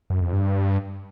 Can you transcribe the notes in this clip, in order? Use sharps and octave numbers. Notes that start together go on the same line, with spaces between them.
F#2
F2
G2